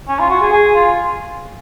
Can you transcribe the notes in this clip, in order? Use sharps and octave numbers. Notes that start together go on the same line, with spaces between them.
C#4
F4
F#4
G#4
G#4
F4